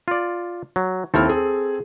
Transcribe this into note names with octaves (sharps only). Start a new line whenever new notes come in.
F4 D5
F#3
D#2 C4 E4 A4 F6
G#4